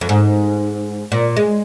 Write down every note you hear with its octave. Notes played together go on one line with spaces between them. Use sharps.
F2
G#2
A#2
G#3